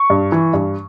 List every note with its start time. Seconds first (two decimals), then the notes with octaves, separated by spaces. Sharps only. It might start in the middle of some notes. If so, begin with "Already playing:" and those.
Already playing: C#6
0.10 G2
0.32 E3
0.53 G2